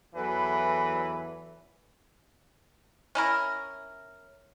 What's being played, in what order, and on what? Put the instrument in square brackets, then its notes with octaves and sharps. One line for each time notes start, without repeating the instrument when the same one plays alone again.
[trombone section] E2 E3 F#3 A4 B4
[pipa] C#4 E4 A#4